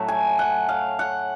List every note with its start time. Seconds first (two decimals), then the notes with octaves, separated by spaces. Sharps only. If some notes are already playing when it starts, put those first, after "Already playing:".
Already playing: A2 F#3 A3
0.08 G#5
0.39 F#5
0.69 F5
0.99 F#5